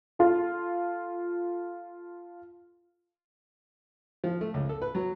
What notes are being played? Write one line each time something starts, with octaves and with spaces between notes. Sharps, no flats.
F4 A4
F3
A3
C#2
A4
B4
F#3